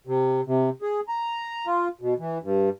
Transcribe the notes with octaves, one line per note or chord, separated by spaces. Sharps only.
C3
C3
G#4
A#5
F4
B2
E3
G2